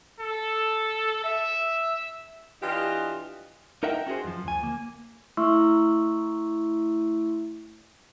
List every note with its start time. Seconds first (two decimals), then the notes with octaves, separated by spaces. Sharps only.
0.20 A4
1.24 E5
2.62 E3 D4 F4 G4 D#5
3.83 D#4 A#4 D#5 E5 F#5 G5
4.07 C#4 F#4 G#4 C5
4.24 F#2 F3
4.45 D2 G#5
4.63 A#3
5.37 A3 E4 E5 C6 C#6 E6